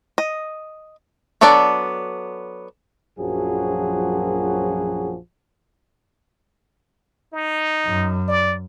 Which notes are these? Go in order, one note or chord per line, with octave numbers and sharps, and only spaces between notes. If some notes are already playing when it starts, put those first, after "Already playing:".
D#5
F#3 B3 D4 A4 D5
A#1 F#2 F3 F#3 F#4 G#4
D#4
F#2
D5